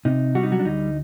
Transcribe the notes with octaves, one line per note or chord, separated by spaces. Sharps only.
C3 D#4
G3 F#4
D#4
F#3 F#4
D4
D2 D#4